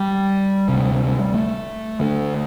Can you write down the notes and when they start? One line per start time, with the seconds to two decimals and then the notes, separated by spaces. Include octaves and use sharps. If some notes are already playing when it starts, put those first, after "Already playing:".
Already playing: G3
0.69 D2 C3
1.34 A3
2.00 D2 D3 A3